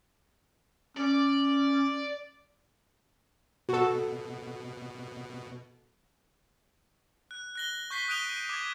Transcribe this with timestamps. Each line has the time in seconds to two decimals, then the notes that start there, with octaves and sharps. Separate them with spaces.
0.97 C#4 D5
3.69 B2 F#4 A4
7.31 F#6
7.56 F#6 A#6 G7
7.90 C#6 G6 B6 C7 G7
8.08 D#6 F#6 D7 D#7 F7 G7
8.49 D6 G#6